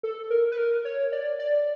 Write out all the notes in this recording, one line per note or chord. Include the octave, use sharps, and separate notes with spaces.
A4
A#4
B4
A#4
C#5
D5
D5